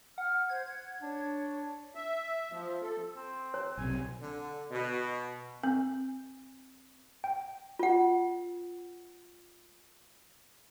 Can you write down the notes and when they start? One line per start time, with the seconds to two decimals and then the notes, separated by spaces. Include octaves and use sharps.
0.18 F#5 F6
0.50 C5 G#6
0.67 F#5
1.02 D4 C#5
1.95 E5
2.52 F3
2.82 A4
3.16 C4
3.54 C#5
3.77 B1 C3 G#5
4.20 D3
4.71 B2
5.63 C4
7.24 G5
7.79 F4 F#5